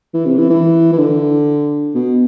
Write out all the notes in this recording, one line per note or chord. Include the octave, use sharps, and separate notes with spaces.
E3
C3
E3
E3
E3
D3
B2